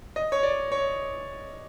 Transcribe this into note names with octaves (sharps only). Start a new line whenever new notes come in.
D#5
C#5
D5
C#5